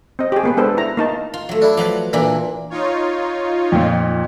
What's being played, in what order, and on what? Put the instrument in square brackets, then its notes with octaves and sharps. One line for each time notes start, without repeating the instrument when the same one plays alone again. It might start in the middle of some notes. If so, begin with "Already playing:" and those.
[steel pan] C4 D#5
G4 G#4
A#3 B3 B4
G#3 B3 D4 A4 B4 C5
E4 A#5
A#3 D#4 A5
[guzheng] F4
F#3 A3
[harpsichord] D4 E4
[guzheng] F3 F#3 B4 [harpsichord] F#5 D6
[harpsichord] A#2 [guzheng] E3 D4 E4
[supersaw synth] D#4 F4 C#5
[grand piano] F2 A#2